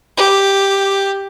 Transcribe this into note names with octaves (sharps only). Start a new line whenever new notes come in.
G4